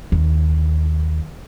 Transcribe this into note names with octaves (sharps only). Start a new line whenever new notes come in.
D#2